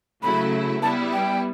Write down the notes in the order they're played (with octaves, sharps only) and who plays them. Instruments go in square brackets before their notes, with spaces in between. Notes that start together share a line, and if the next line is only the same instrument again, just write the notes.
[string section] C#3 F#3 A3 E4 [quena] B5
[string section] G3 B3 E4 [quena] A5
[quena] G5